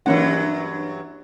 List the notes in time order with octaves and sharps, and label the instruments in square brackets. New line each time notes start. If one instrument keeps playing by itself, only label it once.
[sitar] G2 E3 F#3 [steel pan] A#3 C#4 F#5